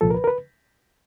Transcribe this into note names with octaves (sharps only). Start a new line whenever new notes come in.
C2 A#2 F3 A4
A#4
B4
A#4
B4